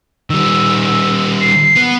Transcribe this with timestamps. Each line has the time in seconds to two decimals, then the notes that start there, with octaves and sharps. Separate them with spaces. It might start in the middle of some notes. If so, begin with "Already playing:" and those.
0.30 D#3 G3 E6
1.41 C7
1.76 B3